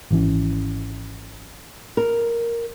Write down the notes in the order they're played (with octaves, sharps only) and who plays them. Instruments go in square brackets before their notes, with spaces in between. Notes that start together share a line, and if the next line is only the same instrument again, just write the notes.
[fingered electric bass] G#1 E3 C#4
[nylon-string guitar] A#4